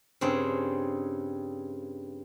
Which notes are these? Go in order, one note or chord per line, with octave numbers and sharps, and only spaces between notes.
G2 C#3 C4 G#4